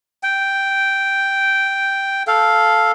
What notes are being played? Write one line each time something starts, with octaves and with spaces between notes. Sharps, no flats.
G5
A4 F5